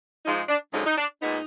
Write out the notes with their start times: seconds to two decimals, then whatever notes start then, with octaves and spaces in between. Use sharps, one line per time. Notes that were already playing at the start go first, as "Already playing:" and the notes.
0.25 G#2 F3 G#3 D#4
0.49 D4
0.73 F#2 D3 F3 G#3 D#4
0.86 D#4
0.97 D4
1.22 A#2 G#3 B3 D#4